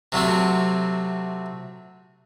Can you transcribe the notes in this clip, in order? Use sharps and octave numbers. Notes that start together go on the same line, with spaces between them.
C3 F#3 A3 C4